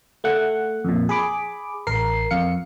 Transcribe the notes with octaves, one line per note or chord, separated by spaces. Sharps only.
A3 F#5
F2 A#2
G#4 B5 D6
A1 A#4 C7
F2 F5 C#7